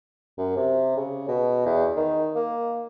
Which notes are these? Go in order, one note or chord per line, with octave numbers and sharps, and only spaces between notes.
F#2
C3
C#3
B2
E2
D#3
A#3